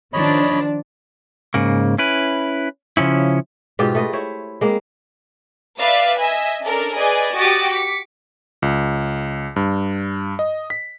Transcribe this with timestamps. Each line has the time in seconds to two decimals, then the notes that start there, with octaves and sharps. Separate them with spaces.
0.13 D#3 F3 D4 C#5 D#5 B5
1.54 G#2 C#3 A#3
1.98 C#4 E4 B4
2.97 C#3 F3 C#4 E4
3.79 G#2 B2 F4 G4
3.95 A3 B4 D#5
4.13 E4 C5 C#5
4.61 G#3 A#3 C4
5.78 B4 D5 E5 F5
6.19 D#5 E5 G#5
6.64 C#4 D4 A4 A#4
6.95 G#4 B4 D5 D#5 G#5
7.36 F#4 G4 D#6 A6 D7
7.72 D6 B6 C#7
8.62 C#2
9.56 G2
10.39 D#5
10.70 B6